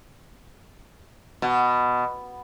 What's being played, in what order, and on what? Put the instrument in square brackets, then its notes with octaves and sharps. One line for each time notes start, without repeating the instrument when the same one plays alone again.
[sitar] B2